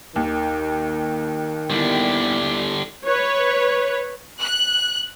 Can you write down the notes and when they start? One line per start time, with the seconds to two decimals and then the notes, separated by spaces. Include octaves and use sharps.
0.16 D#2 D#3
1.70 D3 G3 B3 E4
3.05 B4 C#5
4.40 F#6